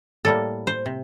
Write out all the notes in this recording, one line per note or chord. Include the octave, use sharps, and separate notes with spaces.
A2 G3 A#3 A4
C5
C3